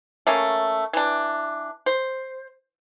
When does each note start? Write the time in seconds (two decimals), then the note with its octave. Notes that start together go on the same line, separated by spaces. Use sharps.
0.27 A3 A#3 C#4
0.93 E3 D4
1.86 C5